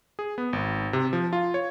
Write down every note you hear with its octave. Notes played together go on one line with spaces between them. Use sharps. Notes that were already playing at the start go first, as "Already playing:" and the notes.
G#4
B3
G#1
C3
F3
F4
C#5